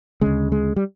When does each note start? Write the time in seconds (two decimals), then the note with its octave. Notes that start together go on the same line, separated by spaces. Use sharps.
0.21 D2 C#3 G#3
0.52 G#3
0.76 G3